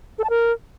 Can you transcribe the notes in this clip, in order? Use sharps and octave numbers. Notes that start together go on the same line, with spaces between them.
A4
A5
A#4